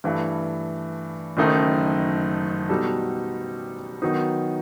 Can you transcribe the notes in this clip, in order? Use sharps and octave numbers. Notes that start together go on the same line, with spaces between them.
G2 E3 A3
F#1 F#2 D#3 A3 D#4
B2 G3 D#4 F#4 A4
D#3 F#3 B3 D#4